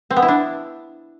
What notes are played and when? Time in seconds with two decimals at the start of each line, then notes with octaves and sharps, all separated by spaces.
0.10 C4
0.16 B3
0.22 E4
0.28 D4